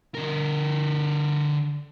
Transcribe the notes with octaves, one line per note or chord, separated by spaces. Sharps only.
D3 A#4